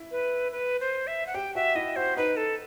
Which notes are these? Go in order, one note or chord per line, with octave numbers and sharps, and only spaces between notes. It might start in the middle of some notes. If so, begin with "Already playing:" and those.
Already playing: E4
B4
B4
C5
E5
F#5
G4 G5
F#4 E5
E4 D#5
F#4 C5
D#4 B4
A4